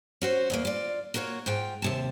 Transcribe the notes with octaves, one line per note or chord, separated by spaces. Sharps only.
C#4 F#4 C5
E2 B2 A#3
F4 D5
A#3 F4 F#4 C5 C#5
G#2 F4 G5
D#2 C3 A5